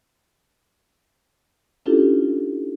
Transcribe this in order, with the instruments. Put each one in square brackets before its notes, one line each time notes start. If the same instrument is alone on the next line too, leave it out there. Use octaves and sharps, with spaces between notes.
[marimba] C#4 D4 E4 F4 G4 A4